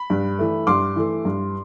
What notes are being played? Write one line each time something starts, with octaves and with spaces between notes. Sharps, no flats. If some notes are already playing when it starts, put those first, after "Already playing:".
Already playing: B5
G2
E3 A3
G2 C6 D6
E3 A3
G2